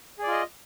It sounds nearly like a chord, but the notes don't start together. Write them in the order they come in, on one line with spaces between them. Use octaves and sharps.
G#4 D5 F4 D#5